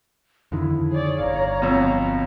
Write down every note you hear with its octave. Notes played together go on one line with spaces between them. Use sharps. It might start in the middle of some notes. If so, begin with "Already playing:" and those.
F2 D3 D#3 E4
G#4 C#5 D5
G1 F5 A#5
F2 B2